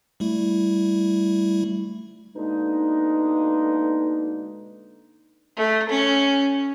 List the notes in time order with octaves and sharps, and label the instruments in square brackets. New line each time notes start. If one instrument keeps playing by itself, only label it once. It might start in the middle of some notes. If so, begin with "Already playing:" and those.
[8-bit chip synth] G3 A3 E4
[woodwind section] B2 D3 G#3 A#3 D4 D#4
[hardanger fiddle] A3
C#4